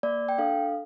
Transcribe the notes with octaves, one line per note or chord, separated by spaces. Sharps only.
A#3 D5
G5
D4 A4 F5